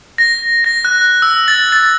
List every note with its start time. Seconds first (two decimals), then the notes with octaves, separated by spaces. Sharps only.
0.18 A#6
0.64 A#6
0.85 F#6
1.22 E6
1.48 A6
1.72 A6